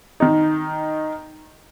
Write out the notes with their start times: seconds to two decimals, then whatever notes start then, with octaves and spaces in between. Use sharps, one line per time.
0.20 D#3 D#4